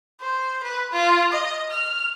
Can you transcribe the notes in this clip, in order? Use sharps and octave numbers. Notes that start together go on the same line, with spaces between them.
C5
B4
F4
D#5
F6